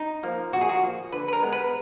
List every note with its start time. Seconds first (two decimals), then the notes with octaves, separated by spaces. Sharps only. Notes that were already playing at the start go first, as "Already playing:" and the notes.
Already playing: D#4
0.23 F3 A#3
0.53 A#2 F#4
0.61 G#4
0.69 F#4
0.83 F3 A#3
1.13 D3 B4
1.28 B4
1.33 A#4
1.42 G#3 B3
1.53 B4